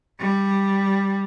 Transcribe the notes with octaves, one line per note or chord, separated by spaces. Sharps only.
G3